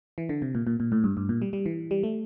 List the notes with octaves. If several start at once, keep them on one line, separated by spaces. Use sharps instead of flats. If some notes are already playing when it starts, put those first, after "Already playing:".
E3
D3
C3
A#2
A#2
A#2
A2
G2
G2
A#2
G3
G3
E3
G3
A3